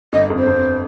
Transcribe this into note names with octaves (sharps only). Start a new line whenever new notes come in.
G1 D#5
F2
C5
F2